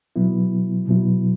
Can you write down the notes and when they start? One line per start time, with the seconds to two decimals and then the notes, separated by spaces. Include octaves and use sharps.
0.16 B2 F#3 B3 E4
0.87 B2 F#3 B3 E4